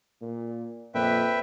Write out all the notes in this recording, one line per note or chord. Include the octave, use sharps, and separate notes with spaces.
A#2
F2 A#2 B4 E5 G5